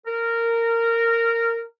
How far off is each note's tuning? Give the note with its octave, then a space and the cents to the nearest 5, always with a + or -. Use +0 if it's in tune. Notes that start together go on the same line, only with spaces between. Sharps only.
A#4 -15